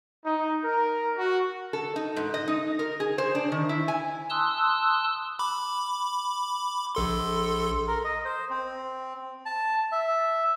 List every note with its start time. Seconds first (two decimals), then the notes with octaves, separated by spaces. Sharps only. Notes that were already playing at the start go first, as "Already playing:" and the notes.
0.25 D#4
0.63 A#4
1.17 F#4
1.73 A4
1.96 D#4
2.16 G#2
2.34 D#5
2.48 D#4
2.79 A#4
3.00 G#4
3.18 C5
3.35 D4
3.52 D#3
3.69 E4
3.88 G#5
4.30 A5 C6 D#6 E6 F#6
5.39 B5 D6
6.95 A#1 A4 C6
7.87 A#4
8.04 D#5
8.25 C5
8.50 C4
9.45 A5
9.92 E5